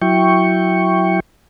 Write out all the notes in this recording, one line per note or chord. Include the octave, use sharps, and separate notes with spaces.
F#3 E4 G5 C#6